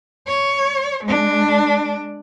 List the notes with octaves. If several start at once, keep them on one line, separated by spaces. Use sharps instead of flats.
C#5
G#3 D4